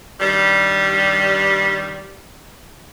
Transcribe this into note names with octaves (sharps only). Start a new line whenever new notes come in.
G2 D#3 G3